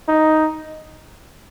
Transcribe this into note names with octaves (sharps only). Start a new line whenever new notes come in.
D#4